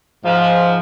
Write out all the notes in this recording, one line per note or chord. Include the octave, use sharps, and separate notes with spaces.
G#2 F3